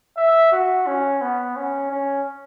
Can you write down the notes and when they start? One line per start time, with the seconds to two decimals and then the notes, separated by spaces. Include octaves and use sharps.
0.17 E5
0.52 F#4
0.87 C#4
1.21 B3
1.56 C#4
1.91 C#4